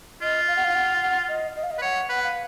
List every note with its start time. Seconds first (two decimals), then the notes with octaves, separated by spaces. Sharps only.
0.22 F4 D#5
0.48 F5
0.56 F#5
0.64 F5
0.75 F#5
1.02 F#5
1.28 D#5
1.56 D#5
1.63 F5
1.71 D#5
1.78 B4
1.82 C#5 F#5
2.09 B4 F#5
2.23 F5